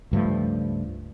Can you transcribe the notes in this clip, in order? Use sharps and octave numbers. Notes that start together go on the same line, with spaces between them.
C#2 G2 F3 A3